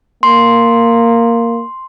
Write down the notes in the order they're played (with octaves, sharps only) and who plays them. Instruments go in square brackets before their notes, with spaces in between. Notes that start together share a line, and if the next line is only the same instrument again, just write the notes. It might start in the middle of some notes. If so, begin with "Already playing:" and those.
[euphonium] A#3 [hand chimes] C6